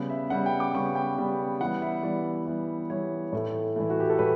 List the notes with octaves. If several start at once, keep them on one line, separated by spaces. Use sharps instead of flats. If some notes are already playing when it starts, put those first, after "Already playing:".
Already playing: C#3 G3 B3
E5
C#3 G3 B3 F#5
G5
D6
C#3 G3 B3 C#6
G5
C#3 G3 B3
E3 G3 B3 F#5
E5
E3 G3 B3 D5
E3 G3 B3
E3 G3 B3 C#5
A2 E3 A3
A2 E3 A3 E4
F#4
G4
A4
A2 B4